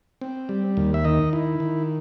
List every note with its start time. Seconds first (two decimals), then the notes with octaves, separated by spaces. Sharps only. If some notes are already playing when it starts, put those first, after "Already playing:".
0.21 C4
0.49 G3
0.77 D#2
0.94 E5
1.05 D#3 D#5
1.33 E4
1.60 D#3